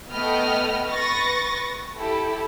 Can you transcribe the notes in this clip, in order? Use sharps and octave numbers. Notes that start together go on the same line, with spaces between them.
A3 B3 D#5 G5 B5 F6
B4 C#6 A6 A#6
E4 G4 A4